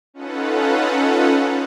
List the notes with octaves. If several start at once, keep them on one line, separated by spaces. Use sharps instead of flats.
C#4 D#4 F4 A4 B4 F#5